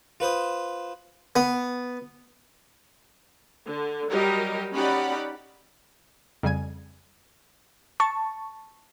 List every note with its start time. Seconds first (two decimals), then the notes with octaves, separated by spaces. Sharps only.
0.20 F4 B4 C5 D#6
1.36 B3
3.66 D3
4.11 F#3 G3 G4 A#4 D#5
4.75 C#4 D#4 G4 D5 F#5 B5
6.43 F2 C#3 G3 G#5 G#6
8.00 A5 C#6